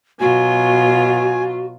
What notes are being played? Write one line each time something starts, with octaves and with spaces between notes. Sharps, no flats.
B2 F#3 F4 F#4 G#5